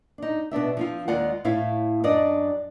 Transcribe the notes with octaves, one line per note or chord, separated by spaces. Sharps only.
D4 D#4
B2 B3 D4 E5
F3 C4 F4
D#2 G#3 F4 D5 F#5
A2 A3 E4 C#5 F5
F#2 D4 D5 D#5